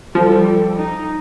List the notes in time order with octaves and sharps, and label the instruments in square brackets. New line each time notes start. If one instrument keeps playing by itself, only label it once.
[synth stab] F3 [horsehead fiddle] G3 A4
[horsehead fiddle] D#4